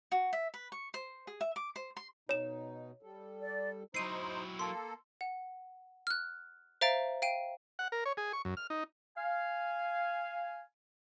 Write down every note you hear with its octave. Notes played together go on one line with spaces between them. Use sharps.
F#4
E5
B4
C#6
C5
G#4
E5
D6
C5
C6
B2 D#4 C#5 E7
G3 A4
D5
F#3 D#4 E4 C5 C7 D#7
A#3 A4 C6
F#5
F6 F#6
C5 E5 F5 A#5 A6 D7
F5 G5 D7 D#7
F#5
A#4
C#5
G#4
C#6
F#2
F6
D#4
F5 G#5